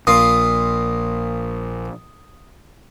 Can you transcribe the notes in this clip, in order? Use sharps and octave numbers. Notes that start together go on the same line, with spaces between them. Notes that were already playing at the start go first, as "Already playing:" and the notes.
A#1 A#2 F4 D#6